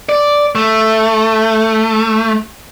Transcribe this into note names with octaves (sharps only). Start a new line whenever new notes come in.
D5
A3